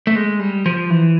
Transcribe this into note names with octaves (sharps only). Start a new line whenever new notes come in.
A3
G#3
G3
F3
E3